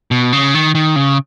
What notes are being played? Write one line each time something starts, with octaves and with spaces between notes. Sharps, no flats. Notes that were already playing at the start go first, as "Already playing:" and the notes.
B2
C#3
D#3
D#3
C#3